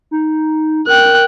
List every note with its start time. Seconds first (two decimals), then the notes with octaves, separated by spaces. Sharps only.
0.11 D#4
0.87 A#4 G5 F#6